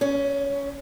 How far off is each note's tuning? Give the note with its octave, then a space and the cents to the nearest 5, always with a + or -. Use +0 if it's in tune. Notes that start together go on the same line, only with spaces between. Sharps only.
C#4 +15